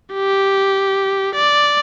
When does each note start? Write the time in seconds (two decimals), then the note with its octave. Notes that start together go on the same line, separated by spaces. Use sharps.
0.13 G4
1.35 D5